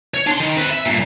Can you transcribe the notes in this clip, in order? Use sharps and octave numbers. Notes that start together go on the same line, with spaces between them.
C#5
D4 C6
D#3
C4 B4
E5
G2 A#2